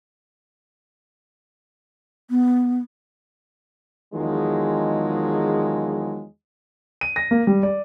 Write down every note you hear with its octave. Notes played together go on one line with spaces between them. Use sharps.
B3
E2 D#3 F3 F#3 G#3
D#7
A#6
A#3
G3
D5